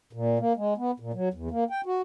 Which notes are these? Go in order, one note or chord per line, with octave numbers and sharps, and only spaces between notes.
A#2
A#3
G#3
B3
A#2
F#3
E2
A#3
G5
F#4